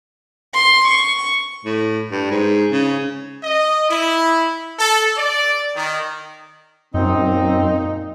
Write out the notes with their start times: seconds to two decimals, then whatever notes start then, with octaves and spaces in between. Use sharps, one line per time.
0.54 C6
0.88 C#6
1.65 A2
2.12 G2
2.31 G#2
2.71 C#3
3.43 D#5
3.90 E4
4.79 A4
5.17 D5
5.76 D#3
6.94 F#2 A#2 C4 D#4